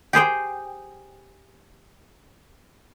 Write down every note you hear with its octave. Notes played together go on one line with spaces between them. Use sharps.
G4 G#4 C5 G5